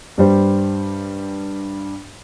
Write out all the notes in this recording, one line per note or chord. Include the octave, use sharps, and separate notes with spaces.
G2 G3 C5